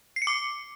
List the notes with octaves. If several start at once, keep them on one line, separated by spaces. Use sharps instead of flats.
C7
C#7
D6